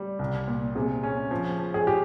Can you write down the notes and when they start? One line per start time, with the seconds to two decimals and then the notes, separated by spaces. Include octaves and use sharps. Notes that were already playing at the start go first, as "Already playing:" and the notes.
Already playing: G3
0.19 C2
0.48 A#2
0.75 C3 G#4
1.03 C#4
1.31 F3
1.59 F3
1.74 G#4
1.87 G4